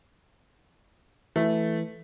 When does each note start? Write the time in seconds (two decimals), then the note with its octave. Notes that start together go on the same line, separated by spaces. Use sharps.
1.36 E3 A3